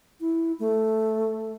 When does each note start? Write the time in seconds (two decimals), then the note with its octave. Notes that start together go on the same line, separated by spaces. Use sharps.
0.21 E4
0.60 A3